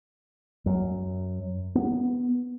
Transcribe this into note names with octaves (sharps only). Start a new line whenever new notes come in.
F#2
B3